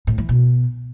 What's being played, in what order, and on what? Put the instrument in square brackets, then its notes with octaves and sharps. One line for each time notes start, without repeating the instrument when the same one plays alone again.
[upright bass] A2
E3
B2